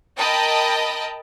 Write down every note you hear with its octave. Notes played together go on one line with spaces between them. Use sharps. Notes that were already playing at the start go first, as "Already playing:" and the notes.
A#4 D#5 G5 A5 B5